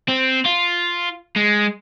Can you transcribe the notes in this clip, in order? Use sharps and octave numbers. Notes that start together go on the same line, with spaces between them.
C4
F4
G#3